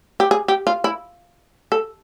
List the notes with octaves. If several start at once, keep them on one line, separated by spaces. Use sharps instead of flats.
G4
G#4
G4
F4
E4
A4